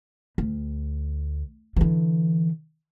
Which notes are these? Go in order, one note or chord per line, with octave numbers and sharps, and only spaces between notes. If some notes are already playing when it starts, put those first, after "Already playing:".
D2
D3 E3